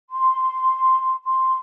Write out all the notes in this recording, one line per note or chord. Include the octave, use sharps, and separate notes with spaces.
C6
C6